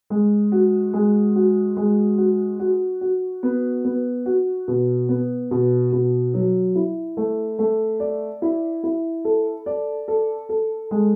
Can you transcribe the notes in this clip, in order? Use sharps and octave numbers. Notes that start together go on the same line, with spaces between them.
G#3
F#4
G#3
F#4
G#3
F#4
F#4
F#4
B3
B3
F#4
B2
B3
B2
B2
F#3
E4
A3
A3
D5
E4
E4
A4
D5
A4
A4
G#3